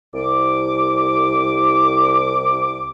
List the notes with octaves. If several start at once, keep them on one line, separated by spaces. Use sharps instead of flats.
C2 D6